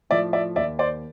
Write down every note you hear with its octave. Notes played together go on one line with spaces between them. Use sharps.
A2 F3 A3 D5 E5
D5 E5
D#2 D5 E5
C5 D5